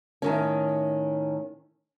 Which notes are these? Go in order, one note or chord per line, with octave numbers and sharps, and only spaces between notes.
A2 D#3 C#4